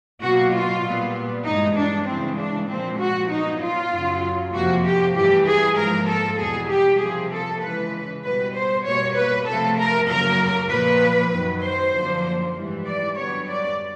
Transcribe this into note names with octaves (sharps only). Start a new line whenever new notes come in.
B2 F#3 A#3 F#4
F4
A#2 G3 B3
G2 E3 G#3 D#4
D4
C#3 E3 G#3 C4
D4
A#2 F3 G#3 C4
F#4
A#2 F#3 B3 D#4
F4
F#2 C#3 F#3
F2 C3 F3 A#3 F#4
G4
G2 E3 A3 G4
G#4
G#2 F3 A#3 A#4
A4
E2 B2 G3 G#4
G4
C3 F3 A#3 G#4
A4
C#3 E3 G#3 B4
B2 G3 B3 B4
C5
B2 G3 A#3 C#5
B4
C3 F3 A3 A4
A#4
F#2 C#3 F#3 A#3 A#4
A#2 F3 A#3 B4
F#2 D#3 F#3
C5
F#2 D3 F3 A#3
G#2 E3 G3
D5
F#2 D3 G3 B3 C#5
D5